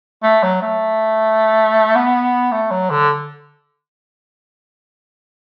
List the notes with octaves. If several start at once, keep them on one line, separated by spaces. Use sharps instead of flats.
A3
F#3
A3
B3
A3
F#3
D3